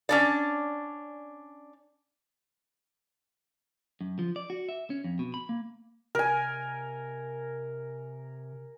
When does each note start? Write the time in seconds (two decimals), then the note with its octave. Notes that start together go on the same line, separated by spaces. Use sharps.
0.09 C#4 D4 D5
4.01 F#2
4.19 F3
4.36 D5
4.50 F#4
4.69 E5
4.90 C#4
5.04 F2
5.19 B2
5.34 B5
5.49 A#3
6.15 C3 A#4 G#5